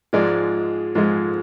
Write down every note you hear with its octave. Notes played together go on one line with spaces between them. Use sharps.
G#2 F3 G#3 D5
G#2 F3 G#3